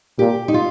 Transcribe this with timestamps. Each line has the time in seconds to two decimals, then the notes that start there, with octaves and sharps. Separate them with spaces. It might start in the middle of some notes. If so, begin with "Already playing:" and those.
0.19 A#2 G4
0.48 D#4
0.54 F4